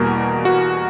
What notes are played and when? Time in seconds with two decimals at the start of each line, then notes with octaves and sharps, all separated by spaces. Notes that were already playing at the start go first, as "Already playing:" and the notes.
Already playing: E2 B2 G3 A#3 A#4
0.45 F#4